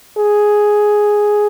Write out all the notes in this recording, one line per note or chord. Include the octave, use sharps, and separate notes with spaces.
G#4